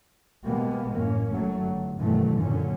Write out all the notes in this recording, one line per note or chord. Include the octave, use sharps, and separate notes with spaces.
B2 G3 G#3 A#3 B3
A1 F#2 A#3 C#4
F#1 F#3 A3
G1
G2 B2 D#3 E3 F#3 A3
F#2 A#2 D3 F#3 C#4